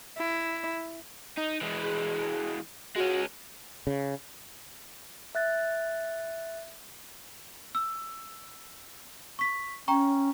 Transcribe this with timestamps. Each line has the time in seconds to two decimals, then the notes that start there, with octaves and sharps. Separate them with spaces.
0.18 E4
1.37 D#4
1.61 E3 G#3
1.83 G#4
2.96 G#3 C#4 F#4
3.87 C#3
5.35 E5 F#6 A6
7.75 E6
9.39 C#6 B6
9.88 C#4 G5 A#5 C#6